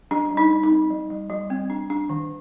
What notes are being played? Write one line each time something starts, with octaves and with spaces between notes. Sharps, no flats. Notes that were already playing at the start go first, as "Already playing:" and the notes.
G3 D4
G3
D#4
G3
D#4
C4
G3
G3
G3
C4
D4
D4
D#3